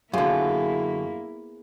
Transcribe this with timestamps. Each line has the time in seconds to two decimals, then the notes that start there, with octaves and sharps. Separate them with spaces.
0.13 F#2 D3 A#3 B3 E4 F4 G#4